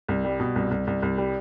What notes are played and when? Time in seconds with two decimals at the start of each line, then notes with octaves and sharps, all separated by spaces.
0.08 C2
0.25 G3
0.40 B2
0.56 C2
0.71 C2
0.87 C2
1.02 C2
1.18 G3